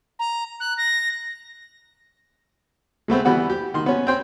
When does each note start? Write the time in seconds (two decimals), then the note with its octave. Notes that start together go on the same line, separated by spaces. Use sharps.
0.19 A#5
0.60 F#6
0.78 A#6
3.08 G#3 A3 B3 C4
3.25 E3 G3 B3 F#4
3.50 G4
3.74 D#3 C6
3.86 B3 C#4
4.07 C4 C#4 G5 C6